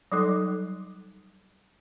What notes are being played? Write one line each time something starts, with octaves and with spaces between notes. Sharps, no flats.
F#3 G3 D#4 A4